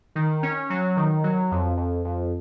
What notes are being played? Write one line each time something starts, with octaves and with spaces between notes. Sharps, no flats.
D#3
C#4
F#3
D#3
F#3
F2
F2
F2